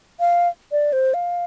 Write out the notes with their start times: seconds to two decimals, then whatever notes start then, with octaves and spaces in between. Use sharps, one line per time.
0.20 F5
0.72 D5
0.93 C5
1.14 F5